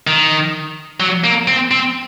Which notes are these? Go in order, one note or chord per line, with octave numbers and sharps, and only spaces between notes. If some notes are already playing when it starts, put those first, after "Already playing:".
D#3
F#3
A#3
C4
C4